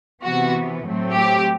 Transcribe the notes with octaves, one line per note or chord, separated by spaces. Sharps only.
C3 E3 B3 F#4
A2 F#3 A3 C4
G4